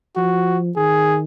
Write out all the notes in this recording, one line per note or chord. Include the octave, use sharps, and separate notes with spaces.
F3 F#4
D#3 G#4